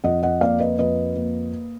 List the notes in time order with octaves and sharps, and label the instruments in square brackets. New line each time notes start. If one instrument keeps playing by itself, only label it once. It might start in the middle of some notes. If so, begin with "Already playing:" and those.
[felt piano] F2 D#5 F#5
D#5 F#5
A#3 D5 F5
B4 D#5
F2 B4 D#5
A#3